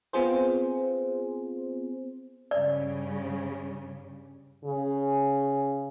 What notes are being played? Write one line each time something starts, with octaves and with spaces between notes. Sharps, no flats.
B3 C4 F4 G#4 C5
G2 C#3 G3 D5
C#3